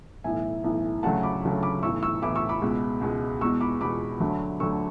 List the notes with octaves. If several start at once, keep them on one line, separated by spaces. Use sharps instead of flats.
B1 A2 E3 E5 G#5
B1 A2 E3
D2 C#3 F#3 A3 F#5 A5
B5 D6
D2 C#3 F#3 A3
B5 D6
B1 A2 E3 C#6 E6
C#6 E6
B1 A2 E3 B5 D6
C#6 E6
B5 D6
C#2 B2 G#3
C#2 B2 G#3
E2 B2 G#3 C#6 E6
B5 D6
E2 B2 G#3 B5 D6
D2 D3 F#3 A3
D2 D3 F#3 A3 C#6 E6